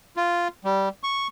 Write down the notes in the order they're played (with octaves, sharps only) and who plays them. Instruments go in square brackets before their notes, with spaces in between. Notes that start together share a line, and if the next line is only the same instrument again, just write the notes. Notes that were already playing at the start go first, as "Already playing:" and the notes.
[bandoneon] F4
G3
C#6